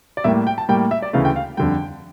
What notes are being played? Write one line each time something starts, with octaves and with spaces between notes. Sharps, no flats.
D5
A2 G3 A#3 E5
G5
A5
A2 G3 A#3 G5
E5
D5
D2 C#3 E3 A3 F5
G5
F5
F2 D3 G3 G5